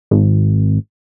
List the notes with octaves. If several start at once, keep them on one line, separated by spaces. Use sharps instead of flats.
G#1